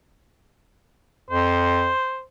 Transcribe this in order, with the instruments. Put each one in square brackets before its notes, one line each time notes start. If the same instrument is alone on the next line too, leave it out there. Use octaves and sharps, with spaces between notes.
[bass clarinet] F2 [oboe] C5